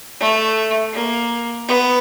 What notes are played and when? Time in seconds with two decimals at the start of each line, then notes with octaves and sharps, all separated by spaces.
0.20 A3
0.94 A#3
1.68 B3